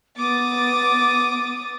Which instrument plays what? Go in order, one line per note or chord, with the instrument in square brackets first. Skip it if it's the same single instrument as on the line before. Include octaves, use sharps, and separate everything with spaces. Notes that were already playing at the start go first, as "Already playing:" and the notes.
[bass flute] B3 [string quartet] D6 D#6 A6